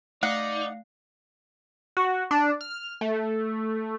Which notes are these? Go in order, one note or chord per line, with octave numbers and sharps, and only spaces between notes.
A3 D#4 D5 F5 F#5 C7
F#4
D4
F6
A3